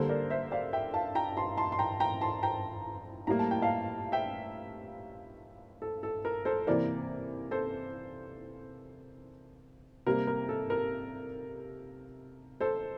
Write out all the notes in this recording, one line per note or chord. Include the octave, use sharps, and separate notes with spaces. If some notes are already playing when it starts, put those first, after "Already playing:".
Already playing: D3 G3 A#3 A4 C5
A#4 D5
C5 E5
D5 F5
E5 G5
F5 A5
G5 A#5
A5 C6
A5 C6
C6
G5 A#5
G5 A#5
A5 C6
G5 A#5
A2 G3 A#3 A#5
A5
G5
F5 A5
E5 G5
A4
A4
A#4
A4 C5
C3 E3 A#3 A#4 D5
A4 C5
C3 G3 A#3 A#4
A#4
A4
A#4
A4 C5